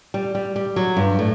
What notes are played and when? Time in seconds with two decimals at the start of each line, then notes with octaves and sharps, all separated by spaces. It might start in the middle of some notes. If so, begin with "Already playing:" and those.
0.14 G3
0.35 G3
0.56 G3
0.76 F#3
0.97 G2
1.19 A2